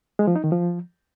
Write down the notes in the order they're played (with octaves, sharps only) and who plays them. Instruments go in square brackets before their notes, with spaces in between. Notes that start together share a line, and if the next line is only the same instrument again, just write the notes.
[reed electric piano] G#3
F3
D#4
D#3
F3